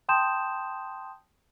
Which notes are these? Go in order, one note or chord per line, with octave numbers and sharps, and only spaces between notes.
G5 A5 C6 D#6 G6 E7